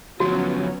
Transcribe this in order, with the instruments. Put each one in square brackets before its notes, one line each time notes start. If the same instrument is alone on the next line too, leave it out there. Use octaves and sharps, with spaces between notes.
[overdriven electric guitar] D2 F3 [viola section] F#3 B3 C#4 [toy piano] F#4